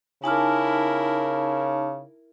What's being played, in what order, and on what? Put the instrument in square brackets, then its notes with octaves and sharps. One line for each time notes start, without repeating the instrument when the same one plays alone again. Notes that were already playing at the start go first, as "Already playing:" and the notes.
[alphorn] C#3 [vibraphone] D#4 A5 D6 [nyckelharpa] E4 A#4 [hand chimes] G#5 F6